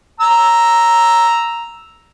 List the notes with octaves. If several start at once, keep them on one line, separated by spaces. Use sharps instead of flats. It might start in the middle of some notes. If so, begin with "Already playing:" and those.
A#5 E6